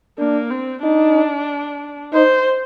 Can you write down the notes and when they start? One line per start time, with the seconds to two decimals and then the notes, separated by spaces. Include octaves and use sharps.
0.18 A#3 D4
0.50 C4
0.83 D4 D#4
2.13 D#4 C5